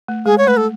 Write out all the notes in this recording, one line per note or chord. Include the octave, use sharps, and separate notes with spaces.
A3
G#3 G#4
C#5
A3 B4
A4